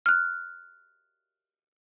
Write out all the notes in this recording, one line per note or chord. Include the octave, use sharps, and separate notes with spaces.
F6 F#6